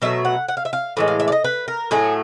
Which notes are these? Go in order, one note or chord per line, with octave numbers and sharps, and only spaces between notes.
B2 F#3 A3 E5
F#5
F#5
F5
E5
F5
A2 E3 G#3
F5
E5
D5
D#5
B4
A#4
A2 F#3 A3 G#4